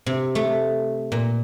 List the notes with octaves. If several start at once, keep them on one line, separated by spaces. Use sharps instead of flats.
C3
A3
A#2